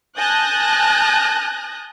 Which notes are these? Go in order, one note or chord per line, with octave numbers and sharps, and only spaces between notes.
G#5 A5 D#6 F#6 G6 A#6